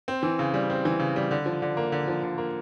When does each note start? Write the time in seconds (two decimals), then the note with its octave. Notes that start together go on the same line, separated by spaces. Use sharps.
0.08 C4
0.23 E3
0.39 C#3
0.54 G3
0.70 C4
0.85 E3
1.00 C#3
1.16 G3
1.31 D3
1.46 F3
1.62 D3
1.77 A#3
1.92 D3
2.08 F3
2.23 D3
2.38 A#3